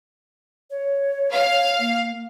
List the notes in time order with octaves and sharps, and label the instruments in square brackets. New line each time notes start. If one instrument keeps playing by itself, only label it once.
[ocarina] C#5
[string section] F5
[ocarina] A#3